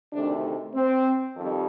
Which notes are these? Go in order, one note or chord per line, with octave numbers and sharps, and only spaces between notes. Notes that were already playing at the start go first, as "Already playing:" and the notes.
D2 C3 D#3 A3 D4
C4
F2 D#3 G3